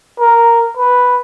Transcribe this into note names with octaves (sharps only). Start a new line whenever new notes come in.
A#4
B4